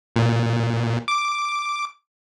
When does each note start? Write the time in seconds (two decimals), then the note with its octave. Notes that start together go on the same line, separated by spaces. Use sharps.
0.16 A#2
1.08 D6